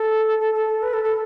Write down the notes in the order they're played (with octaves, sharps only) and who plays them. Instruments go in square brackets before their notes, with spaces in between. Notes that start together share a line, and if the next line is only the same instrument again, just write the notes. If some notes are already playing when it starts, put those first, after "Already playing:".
Already playing: [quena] A4
A4
A4
A4
B4
A4
A4